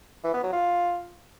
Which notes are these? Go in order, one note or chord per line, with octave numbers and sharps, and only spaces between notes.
E3
B3
F#3
F4